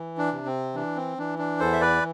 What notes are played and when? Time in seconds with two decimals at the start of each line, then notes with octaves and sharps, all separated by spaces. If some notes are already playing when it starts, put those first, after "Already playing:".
Already playing: E3
0.18 D4
0.32 C3
0.46 C4
0.74 E3 D4
0.96 C4
1.18 E3 D4
1.39 D4
1.59 E2 A4 C5
1.73 E5
1.81 B4 D5